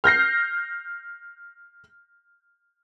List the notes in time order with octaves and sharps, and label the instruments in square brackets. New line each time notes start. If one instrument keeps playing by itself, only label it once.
[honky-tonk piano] F6 G6 A#6 C7